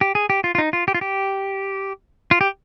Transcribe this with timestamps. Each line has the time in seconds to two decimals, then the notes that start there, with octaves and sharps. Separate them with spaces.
0.01 G4
0.15 G#4
0.30 G4
0.44 F4
0.55 F4
0.58 D#4
0.73 F4
0.88 G4
0.95 F4
1.01 G4
2.31 F4
2.41 G4